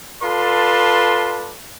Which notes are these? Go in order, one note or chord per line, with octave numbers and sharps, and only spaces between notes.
F4 A4 B4 D5 A5 C6